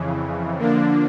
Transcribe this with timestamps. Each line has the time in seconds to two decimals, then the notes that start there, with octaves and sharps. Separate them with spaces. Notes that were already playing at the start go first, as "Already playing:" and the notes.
Already playing: F2 C#3 E3
0.57 D3 F3 A#3 D4